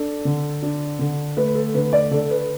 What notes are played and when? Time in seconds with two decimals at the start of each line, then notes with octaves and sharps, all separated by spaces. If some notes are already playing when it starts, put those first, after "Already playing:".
Already playing: D4 A4
0.25 D3
0.62 D4
0.99 D3
1.37 A3 B4
1.55 A4
1.74 D3 B4
1.93 D5
2.11 D3 A4
2.30 B4